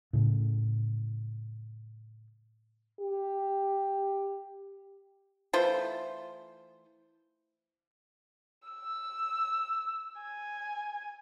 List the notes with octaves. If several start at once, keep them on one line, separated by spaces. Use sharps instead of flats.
A2 C#3
G4
E3 A3 F4 C5
E6
G#5